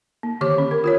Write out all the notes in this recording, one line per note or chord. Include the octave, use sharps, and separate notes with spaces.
A#3
D3 D#3 G4 C#5 D6
C#4
A#4
F4 A#4 C#5